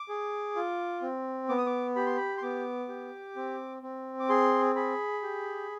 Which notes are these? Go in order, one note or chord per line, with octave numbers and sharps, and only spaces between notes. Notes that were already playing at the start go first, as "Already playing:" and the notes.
Already playing: D6
G#4
F4
C4
B3 D6
D#6
D6
G4 B5
C6
B5
C6
B3 D6
G4
C4
C4
D6
G#4 C6
G#4 B5
G4